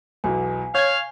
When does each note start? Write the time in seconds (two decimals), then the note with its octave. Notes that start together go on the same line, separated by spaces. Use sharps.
0.24 B1 E2 B2 G#5
0.75 C#5 F5 G6 G#6